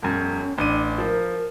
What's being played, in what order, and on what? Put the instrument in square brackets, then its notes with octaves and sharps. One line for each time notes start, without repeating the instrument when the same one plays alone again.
[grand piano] E1 F#2
[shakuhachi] C#4
[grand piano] A1 D#7 [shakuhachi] D4
[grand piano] F3 [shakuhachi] A#4